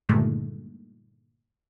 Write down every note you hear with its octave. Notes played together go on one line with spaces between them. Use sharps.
G2 A#2 D3 D#3 G#3 A3